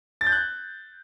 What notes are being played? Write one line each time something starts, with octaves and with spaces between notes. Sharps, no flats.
A6
G6
F#6